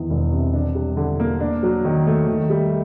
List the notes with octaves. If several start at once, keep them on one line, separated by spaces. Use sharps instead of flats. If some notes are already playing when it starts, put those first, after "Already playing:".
Already playing: E2 D#3
E1
C3
D4
G3
D3
A#3
D4
F#3
D#3
A3
D#3
G3